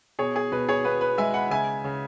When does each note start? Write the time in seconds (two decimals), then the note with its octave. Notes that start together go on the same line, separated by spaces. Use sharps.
0.19 B2 G#4 C#5
0.36 G#4
0.52 B2 B4
0.69 G#4 C#5
0.84 B3 B4
1.01 B4
1.18 G#3 E5 G#5
1.34 F#5 B5
1.50 C#3 E5 G#5
1.84 C#3